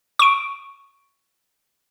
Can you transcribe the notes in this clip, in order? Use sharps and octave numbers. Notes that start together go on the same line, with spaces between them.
C#6 D7